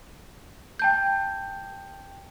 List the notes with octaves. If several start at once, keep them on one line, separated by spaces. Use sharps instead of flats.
G5 A5 G6